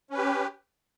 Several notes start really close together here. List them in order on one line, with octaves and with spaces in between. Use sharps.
C#4 B4 G4